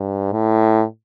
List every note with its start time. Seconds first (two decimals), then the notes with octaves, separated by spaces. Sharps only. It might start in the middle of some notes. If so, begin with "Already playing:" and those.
Already playing: G2
0.32 A2